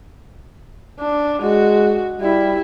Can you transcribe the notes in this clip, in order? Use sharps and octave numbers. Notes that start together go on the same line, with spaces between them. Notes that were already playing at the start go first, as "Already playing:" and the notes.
D4
G#3 F#4
G3 E4